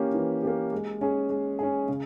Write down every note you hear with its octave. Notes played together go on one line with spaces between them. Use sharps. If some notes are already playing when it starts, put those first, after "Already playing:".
Already playing: E3 A#3 C#4 G4
E3
A#3 C#4 G4
G#3
C#4 G#4
G#3
C#4 G#4
C#3